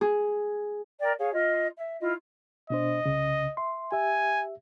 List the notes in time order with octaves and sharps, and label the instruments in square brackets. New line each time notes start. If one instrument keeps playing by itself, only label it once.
[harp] G#4
[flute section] A#4 D5 G5
G#4 C#5 F5
F4 D#5
E5
E4 F4 D#5
[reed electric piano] B2 D4 C5 [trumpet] D#5
[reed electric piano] C2 C#3
E5 C6
[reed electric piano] G4 E5 [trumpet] G#5